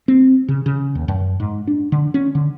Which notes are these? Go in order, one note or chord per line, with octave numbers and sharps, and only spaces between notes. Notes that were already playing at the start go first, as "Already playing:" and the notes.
C4
C#3
C#3
D#2
F#2
G#2
D4
D3
C#4
D3